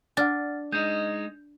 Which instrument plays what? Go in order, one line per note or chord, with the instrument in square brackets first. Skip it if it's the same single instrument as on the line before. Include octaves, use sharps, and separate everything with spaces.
[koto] D4 [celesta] F#5 F6 A6
[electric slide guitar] G#3 D#4 [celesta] G6